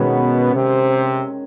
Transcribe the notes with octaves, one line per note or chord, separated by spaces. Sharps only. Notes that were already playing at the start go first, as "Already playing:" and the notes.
Already playing: B2 D#3 G#3 B3 C#4
C3 C4